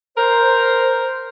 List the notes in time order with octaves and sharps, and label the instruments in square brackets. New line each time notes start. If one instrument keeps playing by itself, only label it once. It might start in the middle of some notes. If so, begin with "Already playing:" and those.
[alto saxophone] A#4 [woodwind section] C5